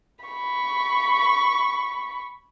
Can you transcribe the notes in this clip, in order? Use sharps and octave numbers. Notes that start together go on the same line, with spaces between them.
B5 C#6